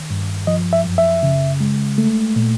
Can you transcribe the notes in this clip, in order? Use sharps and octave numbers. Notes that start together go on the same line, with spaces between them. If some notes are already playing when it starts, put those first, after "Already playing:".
Already playing: D#3
G2
F3 D#5
E5
F#2
E5
C#3
G#3
A3
A#2